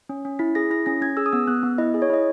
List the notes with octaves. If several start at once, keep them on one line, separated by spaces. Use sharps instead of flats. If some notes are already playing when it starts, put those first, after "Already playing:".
C#4
C#4
E4 B6
G#4 A#6
E4 A#6
C#4 A#6
C#4 G#6
G#4 E6
D#6
B3 E6
B3 F#6
B3
E4 D#5
G#4
C#5
E4 D#5